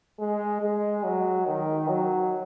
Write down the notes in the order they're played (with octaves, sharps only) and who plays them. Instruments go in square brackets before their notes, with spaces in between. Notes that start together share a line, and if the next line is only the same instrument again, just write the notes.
[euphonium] G#3
G#3
F#3
D#3
F#3